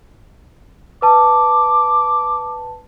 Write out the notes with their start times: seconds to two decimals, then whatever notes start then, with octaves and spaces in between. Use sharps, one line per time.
1.02 B4 A5 D6